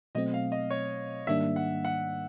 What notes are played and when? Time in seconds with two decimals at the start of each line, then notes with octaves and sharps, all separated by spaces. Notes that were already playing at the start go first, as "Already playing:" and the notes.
0.15 B2 F#3 A3 C4 D#5
0.34 F5
0.52 D#5
0.71 C#5
1.27 G#2 D#3 G3 A#3 D4 E5
1.56 F#5
1.85 F#5